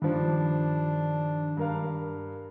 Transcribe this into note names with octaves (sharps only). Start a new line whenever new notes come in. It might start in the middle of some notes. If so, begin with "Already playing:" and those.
G2 D#3 F3 D4
G2 A#4 F5